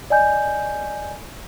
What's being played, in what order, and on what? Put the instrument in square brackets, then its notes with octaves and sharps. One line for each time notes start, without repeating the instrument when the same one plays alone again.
[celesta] D5 D#5 G#5 G6